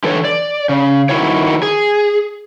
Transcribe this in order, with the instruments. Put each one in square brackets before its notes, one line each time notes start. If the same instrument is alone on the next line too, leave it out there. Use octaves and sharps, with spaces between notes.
[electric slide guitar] D3 E3 A4 C#5
D5
C#3
D#3 E3 E4 F#4 C#5
G#4